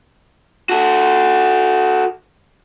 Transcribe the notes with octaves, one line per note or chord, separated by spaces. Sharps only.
F#4 A4